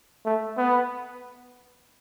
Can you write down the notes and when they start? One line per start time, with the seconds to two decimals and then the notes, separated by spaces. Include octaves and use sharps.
0.25 A3
0.57 B3